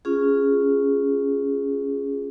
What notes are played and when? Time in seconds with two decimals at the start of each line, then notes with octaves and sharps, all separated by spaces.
0.05 C#4 F4 G#4